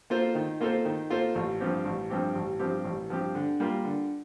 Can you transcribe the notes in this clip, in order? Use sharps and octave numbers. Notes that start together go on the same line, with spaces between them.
A#3 F4 A4 C5
D#3
A#3 F4 A4 C5
D#3
A#3 F4 A4 C5
A1
G2 F3 C4 G4
A1
G2 F3 C4 G4
A1
G2 F3 C4 G4
A1
G2 F3 C4 G4
D3
G3 A#3 F4
D3